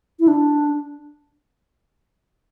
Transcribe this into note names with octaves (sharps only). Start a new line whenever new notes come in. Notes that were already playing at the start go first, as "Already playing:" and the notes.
E4
D4